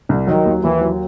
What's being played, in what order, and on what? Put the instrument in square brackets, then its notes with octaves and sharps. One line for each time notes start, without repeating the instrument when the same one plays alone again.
[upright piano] C2
[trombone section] D#3 [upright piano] F#3
[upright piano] D#2
[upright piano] D#2 [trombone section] E3
[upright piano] F#3